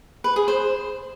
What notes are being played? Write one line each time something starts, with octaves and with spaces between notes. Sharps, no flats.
B4
G#4
C5